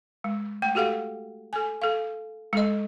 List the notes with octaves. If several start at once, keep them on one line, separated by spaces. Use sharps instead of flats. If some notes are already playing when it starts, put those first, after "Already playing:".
G#3
A3 G5
F#4 G4 A4 F5 F#5
A4 G#5
A4 F5
G#3 A4 D#5